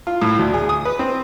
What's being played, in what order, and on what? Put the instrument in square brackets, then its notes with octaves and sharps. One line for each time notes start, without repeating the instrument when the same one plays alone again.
[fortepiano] F4
A2
D2
G#4
D#6
B4
C4